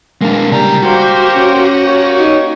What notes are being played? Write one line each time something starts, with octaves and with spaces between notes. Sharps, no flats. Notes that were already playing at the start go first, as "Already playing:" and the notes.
G#3 A#3 D4
C#3 G3 A#5
A#3 F#4 G4 C5
C#4
A#3 G4 C#5
D#4